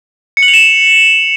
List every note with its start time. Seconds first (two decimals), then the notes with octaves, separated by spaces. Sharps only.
0.37 C#7
0.43 F#7
0.48 F7
0.54 E7